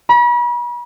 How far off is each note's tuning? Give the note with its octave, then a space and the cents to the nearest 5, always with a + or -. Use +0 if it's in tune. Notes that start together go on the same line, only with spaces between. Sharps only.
B5 -40